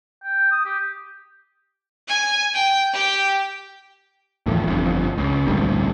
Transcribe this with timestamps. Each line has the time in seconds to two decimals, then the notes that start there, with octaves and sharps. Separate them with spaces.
0.24 G5
0.51 D#6
0.66 G4
2.08 G#5
2.54 G5
2.94 G4 G5
4.46 D#2 A2 E3 F3
4.67 G1 F2
5.18 C#2
5.47 A1 D2 G2 C3